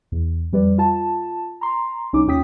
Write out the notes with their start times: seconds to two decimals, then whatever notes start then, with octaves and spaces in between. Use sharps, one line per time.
0.12 E2
0.53 F2 G3 B4 D5
0.78 F4 A5
1.61 A#5 C6
2.13 C2 C#4 D#4 D6
2.27 D#2 C#4 F4 G5 D#6 B6